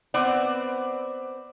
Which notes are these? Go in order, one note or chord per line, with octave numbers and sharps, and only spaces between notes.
B3 C4 C5 D5